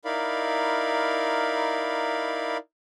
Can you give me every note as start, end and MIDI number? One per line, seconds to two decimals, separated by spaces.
0.05 2.57 63
0.05 2.57 64
0.05 2.57 70
0.05 2.57 74
0.05 2.57 77
0.05 2.57 83